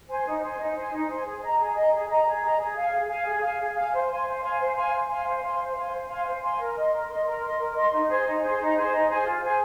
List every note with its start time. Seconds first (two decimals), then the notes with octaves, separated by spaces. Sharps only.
0.08 C5 G#5
0.25 D#4
0.42 C5 G#5
0.58 D#4
0.75 C5 G#5
0.91 D#4
1.09 C5 G#5
1.24 G#4
1.42 D#5 A#5
1.58 G#4
1.75 D#5 A#5
1.92 G#4
2.08 D#5 A#5
2.25 G#4
2.41 D#5 A#5
2.58 G#4
2.75 F5 G#5
2.92 G#4
3.08 F5 G#5
3.25 G#4
3.41 F5 G#5
3.58 G#4
3.75 F5 G#5
3.92 C5
4.08 F5 G#5 C6
4.25 C5
4.41 F5 G#5 C6
4.58 C5
4.74 F5 G#5 C6
4.91 C5
5.08 F5 G#5 C6
5.25 C5
5.41 F5 G#5 C6
5.59 C5
5.75 F5 G#5 C6
5.91 C5
6.08 F5 G#5 C6
6.25 C5
6.41 F5 G#5 C6
6.59 A#4
6.74 D#5 C6
6.91 A#4
7.09 D#5 C6
7.25 A#4
7.42 D#5 C6
7.58 A#4
7.74 D#5 C6
7.92 D#4
8.08 G#4 C5 G#5
8.25 D#4
8.41 G#4 C5 G#5
8.59 D#4
8.75 G#4 C5 G#5
8.91 D#4
9.08 G#4 C5 G#5
9.25 F4
9.42 G#4 C5 G#5